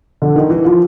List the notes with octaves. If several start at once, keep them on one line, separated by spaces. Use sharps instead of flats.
D3
D#3
E3
F3